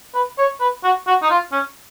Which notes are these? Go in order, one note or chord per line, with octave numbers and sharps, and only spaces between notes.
B4
C#5
B4
F#4
F#4
D#4
F4
C#4